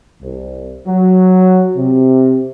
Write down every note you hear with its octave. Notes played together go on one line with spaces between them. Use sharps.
C2
F#3
C3